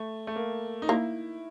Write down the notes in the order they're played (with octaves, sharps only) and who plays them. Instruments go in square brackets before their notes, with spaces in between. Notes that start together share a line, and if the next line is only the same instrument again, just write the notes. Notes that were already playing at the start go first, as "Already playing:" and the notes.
Already playing: [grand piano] A3
A3
A#3
D#4
[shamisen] A#3 [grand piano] E4